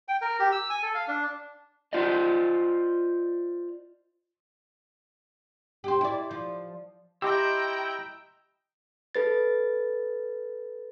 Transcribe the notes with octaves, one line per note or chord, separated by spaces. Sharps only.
G5
A#4
G4
E6
G#5
A4
F5
D4
F4 C5 D5 D#5
G4 C5
E4 D5
F3
E4 G4 D#5 G5 A#5 C6 E6
A4 B4 A6